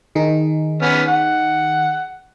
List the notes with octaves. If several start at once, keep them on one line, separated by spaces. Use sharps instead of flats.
D#3 D#4 G#4
B3 C#4 F6
F#5